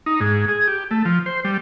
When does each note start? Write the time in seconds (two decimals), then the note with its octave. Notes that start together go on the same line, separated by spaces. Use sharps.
0.06 D#4
0.20 G#2
0.48 G#4
0.68 G4
0.91 A3
1.05 F3
1.26 C5
1.45 G3